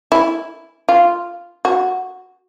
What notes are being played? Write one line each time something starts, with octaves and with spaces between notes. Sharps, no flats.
E4
F4
F#4